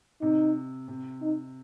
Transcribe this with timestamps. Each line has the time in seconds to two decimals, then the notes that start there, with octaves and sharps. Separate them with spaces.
0.21 C3 D#4
0.88 C3
1.22 D#4